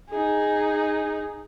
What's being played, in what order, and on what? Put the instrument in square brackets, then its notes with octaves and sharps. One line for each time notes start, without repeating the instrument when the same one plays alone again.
[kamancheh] D#4 G#4